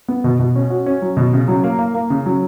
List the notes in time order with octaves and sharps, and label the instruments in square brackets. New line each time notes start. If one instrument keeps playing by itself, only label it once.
[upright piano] B3
B2
B2
C#4
F#4
C#4
F#3
B2
C#3
F#3
A#3
A#3
A#3
C#3
F#3